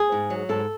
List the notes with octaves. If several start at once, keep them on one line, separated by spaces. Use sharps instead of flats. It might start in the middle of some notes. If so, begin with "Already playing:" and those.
Already playing: G#4
G#2
F#3
G#2 A4